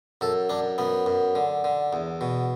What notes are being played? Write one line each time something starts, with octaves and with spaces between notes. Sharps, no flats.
F#2 A4
F#2 D4
F#2 B3
F#2
D3
D3
E2
B2